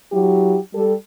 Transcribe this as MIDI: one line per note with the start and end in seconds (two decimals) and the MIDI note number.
0.12 0.58 54
0.12 0.58 64
0.12 0.58 67
0.74 0.94 55
0.74 0.94 67
0.74 0.94 69